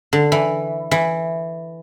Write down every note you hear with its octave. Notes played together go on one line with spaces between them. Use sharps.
D3
E3
E3